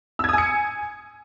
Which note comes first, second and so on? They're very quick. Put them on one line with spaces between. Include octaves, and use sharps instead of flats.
E6 G#6 D#6 G#5 C#7